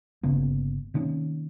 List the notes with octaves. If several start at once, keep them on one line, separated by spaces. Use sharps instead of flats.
G1 C#3 A#3 B3
C3 D#3 A#3 C#4